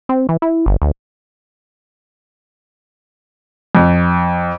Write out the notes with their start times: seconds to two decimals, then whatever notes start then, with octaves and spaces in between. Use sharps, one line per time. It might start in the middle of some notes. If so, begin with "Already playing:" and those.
0.09 C4
0.29 E3
0.42 E4
0.66 G1
0.82 D2
3.75 F2